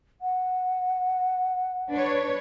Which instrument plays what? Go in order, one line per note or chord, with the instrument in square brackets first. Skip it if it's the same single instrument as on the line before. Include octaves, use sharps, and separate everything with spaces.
[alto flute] F#5
[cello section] D4 B4 C#5